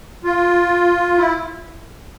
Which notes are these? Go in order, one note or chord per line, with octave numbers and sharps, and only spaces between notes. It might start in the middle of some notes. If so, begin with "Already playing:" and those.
F4
E4